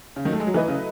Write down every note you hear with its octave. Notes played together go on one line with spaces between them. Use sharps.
C#3
D#3 F#3
A3
G#3
F#3
E3 A3 E4 B4 D#5
C#3